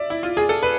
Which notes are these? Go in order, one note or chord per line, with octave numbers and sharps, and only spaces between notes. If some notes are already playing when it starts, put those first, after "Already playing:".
Already playing: D5 E5
E4
F4
G#4
A4
B4